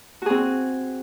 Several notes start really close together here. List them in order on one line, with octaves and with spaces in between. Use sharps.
F#4 G#4 C4